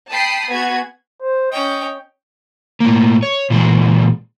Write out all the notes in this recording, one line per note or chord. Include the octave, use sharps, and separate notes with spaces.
G5 A5 B5 D#6 C7
B3 F#4 G#4 G#6
C5
C#4 D#5 G5
A2 A#3
C#5
A#2 E3 G#3